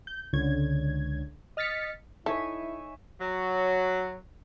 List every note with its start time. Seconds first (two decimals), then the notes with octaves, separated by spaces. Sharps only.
0.07 G6
0.33 C#2 D3 C#5 G#6
1.57 D#5 F6 A6 B6 C#7
2.26 D#4 E4 A4 C#5 E5 G#5 C#6 B6
3.19 F#3